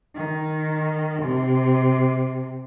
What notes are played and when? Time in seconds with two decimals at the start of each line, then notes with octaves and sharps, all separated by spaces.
0.15 D#3
1.22 C3